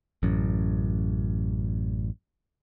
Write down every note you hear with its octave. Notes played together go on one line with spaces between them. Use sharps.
A1 F#2